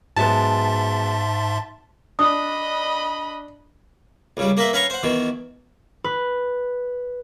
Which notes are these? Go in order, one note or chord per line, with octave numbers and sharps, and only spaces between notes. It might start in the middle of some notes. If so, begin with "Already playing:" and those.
G#2 F#3 G#3 B3 E5 A5 C6
D4 D#5 B5 D#6
C#2 C#3 G3
A#3 A#4 B4 E5
C#4 B4 F5 A#5 C#6
C5 F#5
B2 D#3 E3
B4